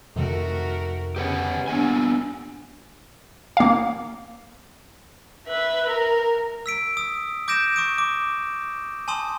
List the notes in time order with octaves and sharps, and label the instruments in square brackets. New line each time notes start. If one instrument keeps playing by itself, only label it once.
[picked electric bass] F2 C3 D#3 [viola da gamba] A3 F#4 A#4
[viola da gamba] C#3 C#4 [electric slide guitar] G4 B4 F#5
[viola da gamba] G2 D4 [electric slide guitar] A#3 B3 G#5
[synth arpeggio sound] A#3 F5
[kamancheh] B4 E5
A#4
[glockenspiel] E6 B6 D7
D#6
D6 G6 A#6 D7 E7
C#6 D#6 D7
D6
G#5 A5 C6 D#6